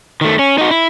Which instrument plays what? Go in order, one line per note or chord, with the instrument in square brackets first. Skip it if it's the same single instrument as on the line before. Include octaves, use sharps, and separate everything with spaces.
[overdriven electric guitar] D#3 A3
C#4
D#4 F#4
E4